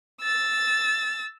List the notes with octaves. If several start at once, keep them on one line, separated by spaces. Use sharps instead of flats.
E6 A6